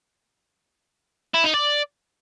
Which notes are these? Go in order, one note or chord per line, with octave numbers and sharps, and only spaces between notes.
E4
D#4
D5